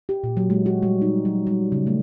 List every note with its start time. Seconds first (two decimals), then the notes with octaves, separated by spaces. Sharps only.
0.09 G4
0.24 A#2
0.37 F#3
0.50 G#3
0.66 F#4
0.83 G3
1.02 D#4
1.25 F#3
1.47 G3
1.72 C#3
1.87 A3